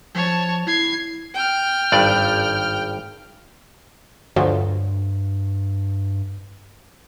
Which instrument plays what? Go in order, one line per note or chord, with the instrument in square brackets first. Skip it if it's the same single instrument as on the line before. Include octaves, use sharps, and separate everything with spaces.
[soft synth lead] F3 [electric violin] C#5 A5
[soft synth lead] E4 [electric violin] G#6 C7
[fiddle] G5 F6
[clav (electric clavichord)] G#1 G2 D5
[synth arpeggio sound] D2 F3 F#3 [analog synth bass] G2